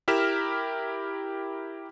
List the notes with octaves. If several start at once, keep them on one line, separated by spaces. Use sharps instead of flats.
E4 G4 A#4 F6 B6 E7